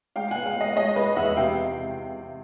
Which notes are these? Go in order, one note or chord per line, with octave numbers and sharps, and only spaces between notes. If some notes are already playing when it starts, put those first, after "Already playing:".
G#3 F5 G5
B3 F#5 G#5
F5 G5
G#3 D#5 F5
G#3 C#5 D#5
G#3 B4 C#5
E2 E5 F#5
C3 F5 G5